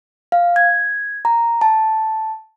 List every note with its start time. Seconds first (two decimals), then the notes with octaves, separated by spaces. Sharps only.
0.32 F5
0.56 G#6
1.25 A#5
1.61 A5